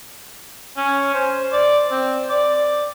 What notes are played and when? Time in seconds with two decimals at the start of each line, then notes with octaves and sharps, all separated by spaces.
0.77 C#4
1.14 C5
1.53 D5
1.91 C4
2.30 D5